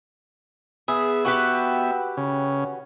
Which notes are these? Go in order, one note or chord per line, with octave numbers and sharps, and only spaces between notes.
B3 G#4 E5
F#4 G4 B4
C#3